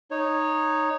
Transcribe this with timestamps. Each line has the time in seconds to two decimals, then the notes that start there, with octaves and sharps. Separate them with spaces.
0.11 D#4 C#5